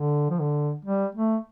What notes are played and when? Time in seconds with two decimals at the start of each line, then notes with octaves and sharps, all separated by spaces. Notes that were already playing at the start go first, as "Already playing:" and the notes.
Already playing: D3
0.30 F3
0.39 D3
0.85 G3
1.15 A3